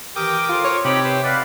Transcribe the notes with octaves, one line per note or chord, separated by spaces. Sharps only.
D#3 E3 G4 A#4 G5 D6 D#6
F4 A4 C5 C6
C#5
C3 C4 D#4 G4 C#5 G5 B5
B4 C5
B4 D5 D#5 F5 F#5